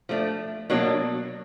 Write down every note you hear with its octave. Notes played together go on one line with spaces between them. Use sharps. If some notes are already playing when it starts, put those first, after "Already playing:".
F3 A3 D4
B2 F#3 A#3 D4